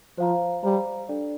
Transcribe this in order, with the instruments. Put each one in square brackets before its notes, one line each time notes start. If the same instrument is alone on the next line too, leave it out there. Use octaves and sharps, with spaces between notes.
[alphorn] F3 [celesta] C5 F5 A#5
[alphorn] G3 [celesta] C5 F5 A#5
[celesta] D4 A4 D5